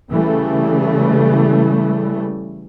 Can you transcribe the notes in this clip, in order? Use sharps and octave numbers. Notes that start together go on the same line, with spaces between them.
C#3 E3 G3 A3